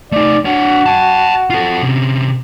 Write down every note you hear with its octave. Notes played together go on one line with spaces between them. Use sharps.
A3 D#4 D5
D4 F#4 C#5
G5 A5
F4 A4
C3 C#4